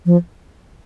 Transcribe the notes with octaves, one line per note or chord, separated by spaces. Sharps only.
F3